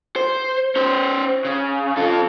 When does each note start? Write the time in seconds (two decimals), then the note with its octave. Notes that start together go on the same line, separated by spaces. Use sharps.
0.16 C5
0.76 C#4 C5
1.45 C#3
1.97 F2 A4